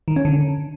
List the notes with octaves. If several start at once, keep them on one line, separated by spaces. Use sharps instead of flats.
D#3
C#4
D3